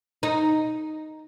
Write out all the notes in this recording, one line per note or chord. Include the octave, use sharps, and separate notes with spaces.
D#4